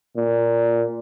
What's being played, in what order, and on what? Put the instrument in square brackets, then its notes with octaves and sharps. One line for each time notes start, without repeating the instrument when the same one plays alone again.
[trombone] A#2